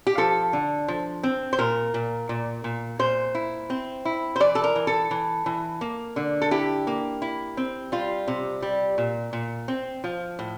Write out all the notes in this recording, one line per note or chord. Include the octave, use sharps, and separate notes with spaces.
G4
F3 A4
D3
F3
C4
C5
A#2 A#4
A#2
A#2
A#2
A#2 C5
E4
C4
E4
C5
E3 D5
A4
A#4
E3
A4
E3
E3
A#3
D3
A4
E4 G4
A#3
E4
C4
G3 F4
C3
G3
A#2
A#2
C4
F3
A2